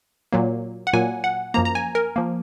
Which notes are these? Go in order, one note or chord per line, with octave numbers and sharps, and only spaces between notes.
A#2 F#3 A#3
F#5
A#2 F#3 A#3 G#5
F#5
F#2 F3 A#3 A#5
A#5
G#5
A#4
F3 A#3